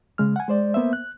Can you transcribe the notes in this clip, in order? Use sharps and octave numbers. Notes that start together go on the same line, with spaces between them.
C#3 G#3 F6
F#5 G#5
G#3 C5 D5
A#3 B3 C5 E5
F#6